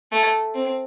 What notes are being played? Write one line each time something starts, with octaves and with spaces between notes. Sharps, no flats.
A3
C4